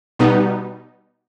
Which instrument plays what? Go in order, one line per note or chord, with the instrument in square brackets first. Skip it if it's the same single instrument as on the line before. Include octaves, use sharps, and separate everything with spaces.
[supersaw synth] B2 G3 B3 D#4